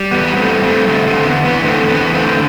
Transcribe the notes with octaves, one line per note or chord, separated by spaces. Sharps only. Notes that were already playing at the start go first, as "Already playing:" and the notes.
Already playing: G3
E2 B3
G3
A3 C4
G3
A3 C4
G3
D3 A3 C4
D3 A3 C4
E2 B3
E2 B3
D3 A3 C4
E2
B3
E2
A3 C4
D3